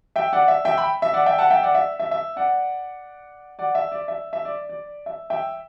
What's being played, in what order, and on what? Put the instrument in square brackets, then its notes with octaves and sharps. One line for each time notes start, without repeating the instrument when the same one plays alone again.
[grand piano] E5 G5
D5 F#5
E5
E5 G5
G5 B5
E5
D5 F#5
E5 G5
F#5 A5
E5 G5
D5 F#5
E5
E5
E5
D5 F#5
D5 F#5
E5
D5
E5
E5
D5
D5
E5
E5 G5